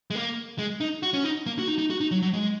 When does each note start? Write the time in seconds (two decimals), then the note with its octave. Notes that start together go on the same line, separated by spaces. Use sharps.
0.10 G#3
0.15 A#3
0.59 G#3
0.80 D#4
1.03 F#4
1.13 C#4
1.24 D#4
1.46 A#3
1.59 F#4
1.68 D#4
1.79 D#4
1.90 F#4
2.01 D#4
2.11 F#3
2.22 F#3
2.33 G#3